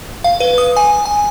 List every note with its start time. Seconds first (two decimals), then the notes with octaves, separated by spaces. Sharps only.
0.24 F5
0.40 B4
0.58 D#6
0.76 G#5
1.05 G#5